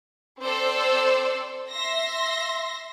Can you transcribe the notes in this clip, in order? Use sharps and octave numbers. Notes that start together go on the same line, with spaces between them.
C4 A4 C5 D5 E6
E5 C6 A#6